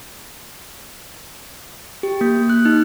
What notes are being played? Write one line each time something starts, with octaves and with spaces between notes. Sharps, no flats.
G4
A#3
F#6
D#4